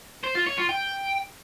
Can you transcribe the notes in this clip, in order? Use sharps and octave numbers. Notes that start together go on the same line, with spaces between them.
C5
F4
C#5
F4
G5